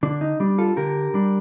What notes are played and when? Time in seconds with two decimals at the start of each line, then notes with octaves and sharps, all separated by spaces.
0.03 D3 D4
0.21 D#4
0.40 G3 D4
0.58 F4 A4
0.77 D3 G4 A#4
1.14 G3 D4